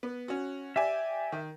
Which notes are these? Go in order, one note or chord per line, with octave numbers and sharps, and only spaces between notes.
B3
C#4 F#4
G4 D5 E5 G#5
D#3